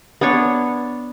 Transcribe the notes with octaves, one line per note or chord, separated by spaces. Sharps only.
B3 D4 C#5 C#6